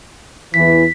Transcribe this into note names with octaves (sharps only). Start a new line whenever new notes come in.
E2 E3 B6